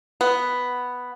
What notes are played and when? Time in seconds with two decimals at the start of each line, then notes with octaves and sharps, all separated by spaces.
0.21 B3